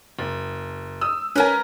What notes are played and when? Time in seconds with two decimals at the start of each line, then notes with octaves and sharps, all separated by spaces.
0.19 F#1
1.01 D#6 E6
1.35 C#4 A#4 B4 G#5